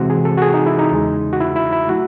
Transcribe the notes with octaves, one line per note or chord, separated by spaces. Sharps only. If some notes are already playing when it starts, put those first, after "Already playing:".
Already playing: C3 E3 G#3 C4 F#4
G#4
A4
F#4
G#4
D#4
E4
D#4
E2 C#3 G#3
F#4
E4
E4
E4
F#3 A3 F#4